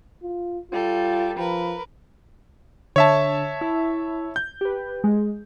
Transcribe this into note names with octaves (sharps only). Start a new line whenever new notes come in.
F4
G3 F4 A4
F3 A#4 B4
D3 C#5 E5 A5
E4
G6
G4 B4
G#3